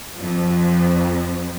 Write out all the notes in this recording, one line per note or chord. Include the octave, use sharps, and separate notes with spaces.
F2